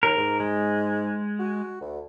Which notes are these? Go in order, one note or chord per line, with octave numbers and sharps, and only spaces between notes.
D#2 A#4
G#2
G#3
F#4
D2